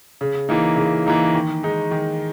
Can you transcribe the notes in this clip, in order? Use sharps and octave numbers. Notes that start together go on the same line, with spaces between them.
C#3
E3 A#3 D#4
C#3
E3 A#3 D#4
D#3
G#3 D#4
D#3